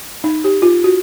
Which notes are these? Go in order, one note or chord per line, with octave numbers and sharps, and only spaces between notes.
D#4
G4
F4
F#4